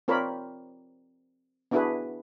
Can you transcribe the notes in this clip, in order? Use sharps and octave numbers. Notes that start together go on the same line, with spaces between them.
C4 F4 A#4 C#5 D5 B5
B3 D4 E4 F#4 G#4 B4